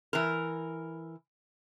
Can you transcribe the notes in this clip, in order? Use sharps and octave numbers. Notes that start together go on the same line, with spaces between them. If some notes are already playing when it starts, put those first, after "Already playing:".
E3 A#4